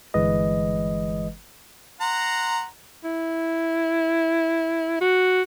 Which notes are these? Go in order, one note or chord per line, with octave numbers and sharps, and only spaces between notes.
G1 E3 G#3 B4 D#5
F#5 A#5 C6
E4
F#4